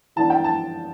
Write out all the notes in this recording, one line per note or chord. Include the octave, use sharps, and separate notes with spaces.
E3 B3 D4 A5
G5
A5